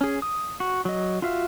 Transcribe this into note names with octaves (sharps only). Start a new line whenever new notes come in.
C#4 G#4
D#6
F#4
F#3 D#5
F4 F#4 E5 F5